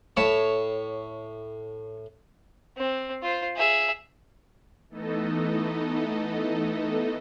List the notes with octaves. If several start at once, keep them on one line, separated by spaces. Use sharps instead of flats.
A2 C#5 A5 B5
C4
F4 C5
G#4 E5
E3 A3 B3 D#4 A4 D#5